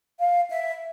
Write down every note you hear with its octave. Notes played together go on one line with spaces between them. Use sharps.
F5
E5